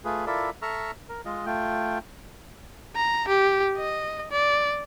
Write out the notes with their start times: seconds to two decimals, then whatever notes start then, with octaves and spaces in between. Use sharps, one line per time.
0.05 A3 F4 G#4 B4
0.27 E4 F4 A4 A#4 D5 E5
0.62 A4 E5 A#5 C#6 E6 F6
1.09 A#4
1.25 G#3 F4 D#5
1.46 A3 F4 G5
2.96 A#5
3.28 G4
3.77 D#5
4.32 D5